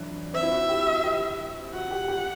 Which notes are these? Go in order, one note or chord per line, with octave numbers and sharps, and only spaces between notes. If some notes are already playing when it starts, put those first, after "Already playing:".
Already playing: E3 F#3 D4
C4 E5
E4
F#4
G4
F#4
G4
F#4 F#5
G4
G4